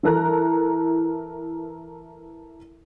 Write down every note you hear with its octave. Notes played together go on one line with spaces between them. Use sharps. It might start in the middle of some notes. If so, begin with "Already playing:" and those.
E3 E4 A4 A#4 A#5 F#6